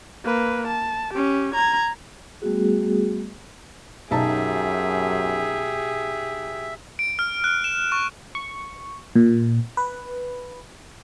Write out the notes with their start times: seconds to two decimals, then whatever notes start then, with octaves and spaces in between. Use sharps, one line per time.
0.24 A#3 B4
0.67 A5
1.13 C#4 G4
1.55 A#5 G#6
2.42 G3 A3 B3 F#4 G#4
4.11 B1 F#2 D#4 G4 G#4 E5 A5
6.99 D7
7.19 F6
7.44 F#6
7.64 E7
7.92 C#6
8.35 C#6
9.16 A#2
9.77 B4